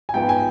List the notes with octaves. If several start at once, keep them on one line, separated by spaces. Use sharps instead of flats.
G#5
G#2 F3 B3 F4 G5
G#5